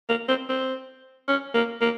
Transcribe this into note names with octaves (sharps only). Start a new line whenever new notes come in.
A#3
C4
C4
C#4
A#3
A#3